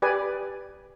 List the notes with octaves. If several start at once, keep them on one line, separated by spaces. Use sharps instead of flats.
G4 B4 D5 G#5